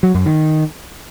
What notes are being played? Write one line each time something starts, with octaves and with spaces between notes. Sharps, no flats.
F#3
F#2
D#3